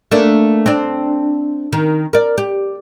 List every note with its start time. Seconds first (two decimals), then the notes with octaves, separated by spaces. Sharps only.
0.11 A3 A#3 D4
0.66 C4 D4
1.73 D#3
2.13 A#4 D5
2.38 G4